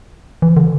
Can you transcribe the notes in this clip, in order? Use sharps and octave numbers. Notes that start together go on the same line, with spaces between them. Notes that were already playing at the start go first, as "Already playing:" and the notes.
E3
D3